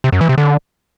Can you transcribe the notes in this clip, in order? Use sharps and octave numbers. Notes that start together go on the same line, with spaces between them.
C3
F#2
E3
C3
D3